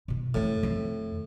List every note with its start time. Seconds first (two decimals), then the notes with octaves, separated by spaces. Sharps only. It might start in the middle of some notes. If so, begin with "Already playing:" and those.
0.08 B2 E4
0.34 F2 A2 E3
0.63 F2 D#3